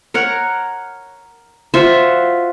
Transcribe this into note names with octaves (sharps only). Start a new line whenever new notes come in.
A#4 C#5 F#5
F4 F#4 C5 E5